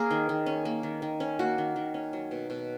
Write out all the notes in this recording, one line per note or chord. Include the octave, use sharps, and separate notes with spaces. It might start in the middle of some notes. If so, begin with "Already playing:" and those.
Already playing: A#3 C#4 G#4 A#4
D#3
D#3
C#4
A#3
D#3
D#3
C#4
A#3 F#4
D#3
D#3
C#4
F#3
B2
B2